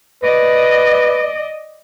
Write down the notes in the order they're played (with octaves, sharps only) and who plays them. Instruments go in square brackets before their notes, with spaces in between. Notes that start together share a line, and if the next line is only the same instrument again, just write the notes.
[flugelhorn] B4 [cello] D5 D#5